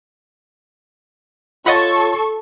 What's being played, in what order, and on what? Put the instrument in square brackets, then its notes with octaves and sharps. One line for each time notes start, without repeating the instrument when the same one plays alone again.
[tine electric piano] F4 C#5 A6 [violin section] A4 C#6 [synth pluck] D#5 F#5 B5